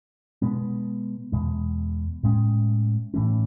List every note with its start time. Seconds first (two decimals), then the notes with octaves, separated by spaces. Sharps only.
0.42 B2 G#3 B3
1.32 E2 B2 G#3
2.23 A2 G#3 C#4
3.14 A2 E3 A3 C#4